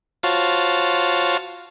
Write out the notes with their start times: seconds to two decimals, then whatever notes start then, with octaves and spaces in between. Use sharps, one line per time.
0.23 F4 F#4 C5 C#5 F5 A5